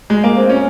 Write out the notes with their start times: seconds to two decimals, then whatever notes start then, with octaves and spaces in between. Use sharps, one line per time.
0.10 G#3
0.24 A#3
0.37 C4
0.49 C#4